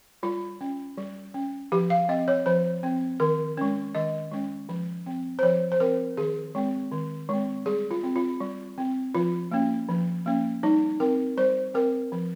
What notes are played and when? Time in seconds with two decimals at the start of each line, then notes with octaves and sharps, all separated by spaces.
0.23 G3 F4
0.61 C#4
0.97 G3
1.34 C#4
1.72 F3 G4
1.90 F5
2.09 C4 D#5
2.28 C#5
2.46 F3 C5
2.83 C4
3.20 D#3 A#4
3.57 G#3 C#4
3.95 D#3 D#5
4.32 G#3 C#4
4.69 F3
5.06 C4
5.39 C5
5.43 F3 C#5
5.72 C5
5.80 C4 A#4
6.17 D#3 G#4
6.55 G#3 C4
6.92 D#3
7.29 G#3 C4
7.66 G3 G#4
7.91 F4
8.03 C4
8.16 F4
8.41 G3
8.78 C4
9.15 F3 F4
9.51 A#3 C#4
9.89 F3
10.26 A#3 C#4
10.63 G3 D#4
11.00 C4 A#4
11.37 G3 C5
11.74 C4 A#4
12.12 F3